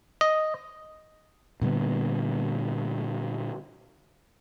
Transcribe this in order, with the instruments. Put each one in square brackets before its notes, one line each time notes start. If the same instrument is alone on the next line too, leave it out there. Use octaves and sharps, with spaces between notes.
[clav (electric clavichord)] D#5
[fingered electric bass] A#2 D3 G3 B3